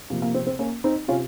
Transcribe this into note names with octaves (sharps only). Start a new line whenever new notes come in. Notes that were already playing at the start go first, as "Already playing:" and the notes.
C3 F3 A#3
A#3
C4
C4
A#3 C#4
C4 D#4
C3 C#4 F4